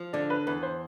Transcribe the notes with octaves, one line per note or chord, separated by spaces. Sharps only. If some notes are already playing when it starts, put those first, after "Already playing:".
Already playing: F3
D3 D5
B4
E2 B4
C5